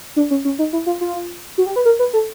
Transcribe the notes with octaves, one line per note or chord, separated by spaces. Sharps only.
D4
C#4
C#4
D#4
E4
F4
F4
F#4
G4
B4
A#4
B4
A4